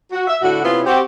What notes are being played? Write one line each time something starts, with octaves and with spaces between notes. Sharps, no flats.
F#4
E5
A2 D3 E4 F#4
C3 B3 C#4 E4 F4
C4 F#4 G4